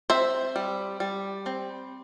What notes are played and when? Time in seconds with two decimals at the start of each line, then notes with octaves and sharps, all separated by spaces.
0.10 C4 C5 E5
0.56 G3
1.00 G3
1.46 C4